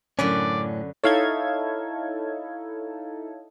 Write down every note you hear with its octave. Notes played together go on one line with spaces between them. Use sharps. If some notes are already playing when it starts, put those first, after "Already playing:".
F#2 A2 D3 C#4 B4 D5
D#4 E4 A4 C#5 F5 G#6